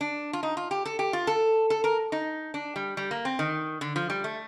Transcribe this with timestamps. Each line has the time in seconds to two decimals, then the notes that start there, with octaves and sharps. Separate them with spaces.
0.01 D4
0.33 F4
0.43 D#4
0.57 F4
0.71 G4
0.85 A4
0.99 G4
1.13 F4
1.27 A4
1.70 A4
1.84 A#4
2.12 D#4
2.54 D4
2.76 G3
2.97 G3
3.11 A#3
3.25 C4
3.39 D#3
3.81 D3
3.96 F3
4.10 G3
4.24 A3